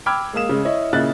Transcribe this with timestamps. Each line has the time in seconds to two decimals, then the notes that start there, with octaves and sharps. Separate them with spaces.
0.06 G5 B5 D6 E6 F6 G#6
0.33 G#3 A#3 F5 D#6 E7
0.49 C#3 G#3
0.65 E4 C#5 D#5
0.93 A#2 C#3 E4 D#5 F#6 A6